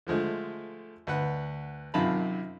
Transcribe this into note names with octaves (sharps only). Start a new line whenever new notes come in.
D3 F3 G#3 A3
D2 B4 F#5
F#2 C3 D#3 F4 A5 B5